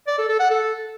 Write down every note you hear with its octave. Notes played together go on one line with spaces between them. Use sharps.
D5
A4
A4
F#5
A4